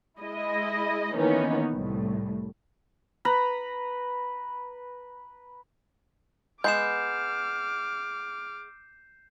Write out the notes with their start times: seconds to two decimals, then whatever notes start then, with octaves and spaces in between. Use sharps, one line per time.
0.20 G#3 E4 D#5
1.13 D#3 E3 A#3 B3 C#4 D#4
1.75 C2 A2
3.25 B4 A#5 B5
6.64 G#3 B3 D6 F6 G6 C7 E7